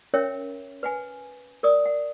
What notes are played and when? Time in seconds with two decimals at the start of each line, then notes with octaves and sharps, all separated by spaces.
0.14 C#4 A#4 C#5 E5 G5
0.83 B4 F#5 G#5
1.63 A#4 D5 D#6
1.86 F#5